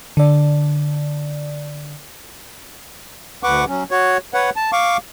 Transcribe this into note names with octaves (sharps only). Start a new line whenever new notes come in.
D3 D5
D2 B4 F#5 C#6 D6
F#3 C#4
F#4 C#5
B4 C#5 F#5
A5
F5 C#6 D6